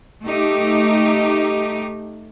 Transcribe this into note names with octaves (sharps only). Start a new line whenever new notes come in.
A3 D#4 G4